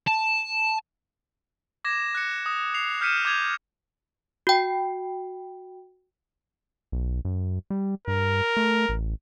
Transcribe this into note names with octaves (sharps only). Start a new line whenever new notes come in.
A5
D6 G#6 A#6 E7
F#6 C#7
D#6
C7 F7
F6 G6 B6 C#7 D#7 E7
D6 G6 G#6 F7
F#4 G5
B1
F#2
G3
G2 A#4
A3
A1